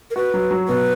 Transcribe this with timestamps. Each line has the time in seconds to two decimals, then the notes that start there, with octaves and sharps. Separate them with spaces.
0.11 A#4
0.16 F#4 B4
0.34 F#3
0.51 F#3
0.68 B2 B4